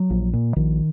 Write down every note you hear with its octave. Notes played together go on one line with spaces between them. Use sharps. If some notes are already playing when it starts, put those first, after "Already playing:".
Already playing: F#3
A#1
A#2
A#1 D#3